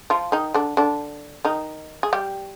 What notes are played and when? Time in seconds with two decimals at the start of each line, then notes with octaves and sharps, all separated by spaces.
0.10 F3 F4
0.32 D#3 D#4
0.54 D3 D4
0.77 D3 D4
1.45 D#3 D#4
2.03 G#4
2.13 G3 G4